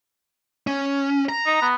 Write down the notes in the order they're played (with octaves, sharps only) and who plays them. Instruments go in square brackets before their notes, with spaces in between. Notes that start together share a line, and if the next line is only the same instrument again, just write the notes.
[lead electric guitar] C#4
A#5
[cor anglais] D#4
B3